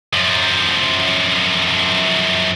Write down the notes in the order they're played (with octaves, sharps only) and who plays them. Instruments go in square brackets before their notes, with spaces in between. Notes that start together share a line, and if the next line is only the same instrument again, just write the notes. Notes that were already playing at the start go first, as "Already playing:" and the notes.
[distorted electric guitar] F#2 F3